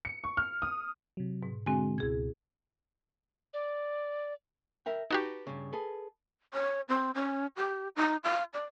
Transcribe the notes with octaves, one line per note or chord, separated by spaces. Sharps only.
C#7
C#6
F6
D#6
C3 F#3
G#2 B2
D3 G#3 C4 F#4 G#5
C#2 B2 E4 G#4 G#6
D5
A#4 E5 G5
D#4 F#4 G4 B4 A5
G2 C#3
G#4 A4 B4
C#5
C4
C#4
G4
D#4
F5
D5